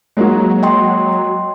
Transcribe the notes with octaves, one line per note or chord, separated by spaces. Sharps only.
F#3 G#3 A#3 F#4
D#5 G5 C6